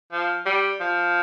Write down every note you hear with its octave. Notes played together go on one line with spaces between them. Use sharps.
F3
G3
F3